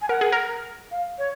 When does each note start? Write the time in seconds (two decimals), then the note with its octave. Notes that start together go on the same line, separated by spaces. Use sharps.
0.02 G#5
0.09 A#4 F#5
0.21 G#4
0.32 A#4
0.91 F5
1.18 C#5